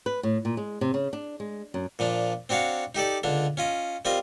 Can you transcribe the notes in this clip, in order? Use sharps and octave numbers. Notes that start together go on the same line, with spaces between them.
B4
A2
A#2
G#3
C3
C#3
D4
G#3
F#2
A#2 F3 D4
C4 D4 F#4 C#5 F5
D#4 G4 A4 D5
C#2 D3 D4
C#4 F4 D#5
G3 C4 F4 A#4 D#5